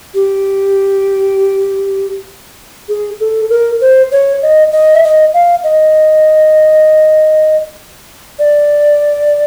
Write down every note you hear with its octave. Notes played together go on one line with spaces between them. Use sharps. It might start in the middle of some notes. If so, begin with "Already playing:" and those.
G4
G#4
A4
A#4
C5
C#5
D#5
D#5
E5
D#5
F5
D#5
D5